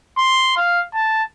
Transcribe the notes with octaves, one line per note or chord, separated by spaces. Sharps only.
C6
F5
A5